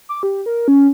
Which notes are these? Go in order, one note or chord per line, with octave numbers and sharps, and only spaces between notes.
D6
G4
A#4
C#4